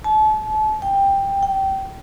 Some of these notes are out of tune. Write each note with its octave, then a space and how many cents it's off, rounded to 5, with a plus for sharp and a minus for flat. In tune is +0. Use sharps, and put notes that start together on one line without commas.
A5 -35
G5 +10
G5 -20